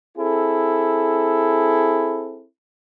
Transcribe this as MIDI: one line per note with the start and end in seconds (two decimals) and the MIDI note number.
0.17 2.45 60
0.17 2.45 64
0.17 2.45 68
0.17 2.45 69